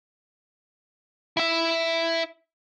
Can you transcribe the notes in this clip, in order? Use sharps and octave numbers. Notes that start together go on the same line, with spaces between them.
E4 E5